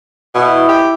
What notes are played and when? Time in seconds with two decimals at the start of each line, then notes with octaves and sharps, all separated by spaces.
0.35 B2 E4
0.69 G4